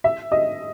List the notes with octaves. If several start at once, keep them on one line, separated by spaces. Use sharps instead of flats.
E5
D#5